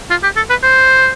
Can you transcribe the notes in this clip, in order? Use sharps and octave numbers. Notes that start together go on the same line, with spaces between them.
F4
G4
A4
B4
C5